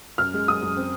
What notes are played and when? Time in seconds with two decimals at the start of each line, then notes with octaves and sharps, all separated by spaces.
0.18 F#2 F6
0.34 G#3
0.48 F#2 D#6
0.62 F#2
0.77 C4